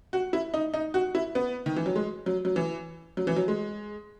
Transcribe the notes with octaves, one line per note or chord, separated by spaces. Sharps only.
F#4
E4
D#4
D#4
F#4
E4
B3
D#3
E3
F#3
G#3
F#3
F#3
E3
F#3
E3
F#3
G#3